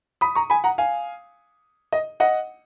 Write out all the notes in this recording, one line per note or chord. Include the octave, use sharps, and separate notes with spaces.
B5 D#6
A#5 C#6
G#5 B5
F#5 A#5
F5 G#5
D#5
D#5 F#5